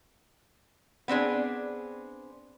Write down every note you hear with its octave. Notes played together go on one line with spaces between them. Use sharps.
B3 C4 D4 G#4